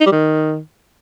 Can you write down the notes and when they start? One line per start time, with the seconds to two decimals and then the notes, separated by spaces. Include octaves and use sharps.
0.01 D#4
0.06 G3
0.12 D#3